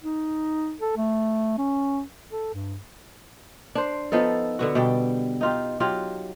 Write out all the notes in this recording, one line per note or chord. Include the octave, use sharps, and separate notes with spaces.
D#4
A4
A3
C#4
A4
G2
D4 C5
F3 B3 D#4 A4
D3 B3 F#4
B2 G3 G4 G5
D#4 F4 G4
F#3 F4 G4